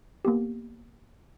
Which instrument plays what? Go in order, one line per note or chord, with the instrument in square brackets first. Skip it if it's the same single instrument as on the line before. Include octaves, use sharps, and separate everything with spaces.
[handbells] A#3 B3 G4